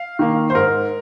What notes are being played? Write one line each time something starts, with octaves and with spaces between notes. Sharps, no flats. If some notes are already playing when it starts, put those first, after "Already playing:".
Already playing: F5
D#3 A#3
C5
G#2 A#4